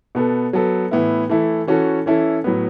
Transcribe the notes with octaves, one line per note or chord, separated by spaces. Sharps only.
B2 B3 A4
F#3 B3 A4
A2 E3 B3 E4
E3 A3 E4 A4
E3 C#4 F#4 A4
E3 C#4 E4 A4
A2 F#3 B3